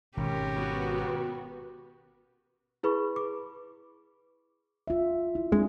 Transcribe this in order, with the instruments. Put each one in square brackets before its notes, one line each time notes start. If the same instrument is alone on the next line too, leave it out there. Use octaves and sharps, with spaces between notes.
[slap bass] G#1 [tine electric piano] B2 [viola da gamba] C#4 G4 A#4
[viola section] B3 F#4
[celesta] E4 G#4 B4 B5 C#6
D6
[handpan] F4 E5
E4
[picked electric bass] G#3 [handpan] C4 D4 G#4